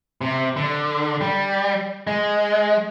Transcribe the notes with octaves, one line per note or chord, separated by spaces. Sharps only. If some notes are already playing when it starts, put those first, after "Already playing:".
C3
D3
G3
G#3